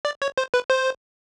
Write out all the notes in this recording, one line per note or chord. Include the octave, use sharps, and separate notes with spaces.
D5
C#5
C5
B4
C5